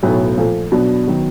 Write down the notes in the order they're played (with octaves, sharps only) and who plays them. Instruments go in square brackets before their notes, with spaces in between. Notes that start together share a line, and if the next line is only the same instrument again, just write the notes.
[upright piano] B1 A2 F#3 B3
A#2 F3 A3
B2 F#3 B3 D4
D#3 F#3 B3